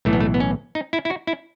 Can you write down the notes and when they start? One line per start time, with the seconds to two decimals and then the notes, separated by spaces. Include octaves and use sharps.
0.05 B1 A2 E3 A3
0.13 B3
0.20 A3
0.34 B3
0.40 C#4
0.75 D#4
0.93 E4
1.05 E4
1.10 F#4
1.27 E4